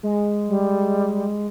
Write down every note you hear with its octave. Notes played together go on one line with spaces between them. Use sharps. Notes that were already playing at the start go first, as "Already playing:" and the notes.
G#3
G3